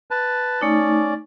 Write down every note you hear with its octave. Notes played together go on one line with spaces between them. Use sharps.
B4 A5
A3 C#4 D#4 D5